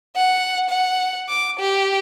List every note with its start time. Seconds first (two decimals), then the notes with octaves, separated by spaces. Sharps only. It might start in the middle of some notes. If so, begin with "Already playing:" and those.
0.16 F#5
0.69 F#5
1.29 D6
1.59 G4